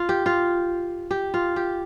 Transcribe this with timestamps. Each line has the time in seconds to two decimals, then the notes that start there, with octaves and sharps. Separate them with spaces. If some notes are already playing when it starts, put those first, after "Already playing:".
Already playing: F4
0.09 G4
0.26 F4
1.11 G4
1.34 F4
1.56 G4